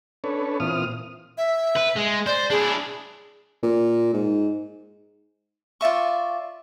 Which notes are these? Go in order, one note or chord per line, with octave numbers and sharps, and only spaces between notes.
C#4 D4 A4 B4 C#5
A#2 E3 C4 F4 D#6 F6
E5
B4
G#3
C5 D5
D4 E4 G#4
A#2
G#2
F4 D5 E5 C#6